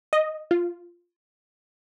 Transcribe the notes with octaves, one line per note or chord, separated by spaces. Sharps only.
D#5
F4